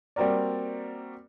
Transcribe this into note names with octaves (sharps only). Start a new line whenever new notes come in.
G3 A#3 C4 F#4 A#4 D5